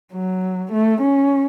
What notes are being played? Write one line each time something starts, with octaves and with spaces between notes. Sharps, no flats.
F#3
A3
C#4